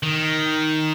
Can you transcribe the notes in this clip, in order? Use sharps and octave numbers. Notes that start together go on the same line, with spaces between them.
D#3